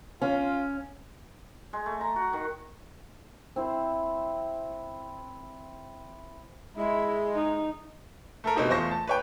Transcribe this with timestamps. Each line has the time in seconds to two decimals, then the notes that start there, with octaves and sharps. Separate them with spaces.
0.22 C#4 F4
1.73 G#3
1.86 A3
2.01 A#5
2.16 F#4
2.33 D#3
3.56 C4 E4 C5
6.76 G#3 E4
7.34 D#4
8.44 A3 A4 A#4
8.56 B2 C4 D#4 G4
8.69 E2 A3 F4 C5 C#6 A#6
8.91 A5
9.07 B4 C#5 G5